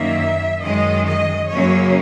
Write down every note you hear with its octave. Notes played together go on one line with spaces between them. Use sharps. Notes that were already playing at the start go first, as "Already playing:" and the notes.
Already playing: F#2 D#3 A#3 E5
F#2 D#3 G#3 D#5
D#5
F#2 C#3 F#3 A#3 C#4 C#5